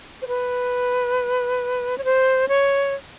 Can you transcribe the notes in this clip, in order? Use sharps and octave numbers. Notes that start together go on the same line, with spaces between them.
C5
B4
C#5
C5
C#5